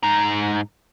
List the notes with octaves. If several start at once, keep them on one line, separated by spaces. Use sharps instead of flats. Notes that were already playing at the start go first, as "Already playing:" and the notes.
G#2 A#5